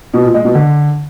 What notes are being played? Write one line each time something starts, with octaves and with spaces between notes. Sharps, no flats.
B2
A#2
G#3
B2
D3